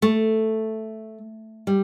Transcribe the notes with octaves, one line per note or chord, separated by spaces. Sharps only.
A3
G3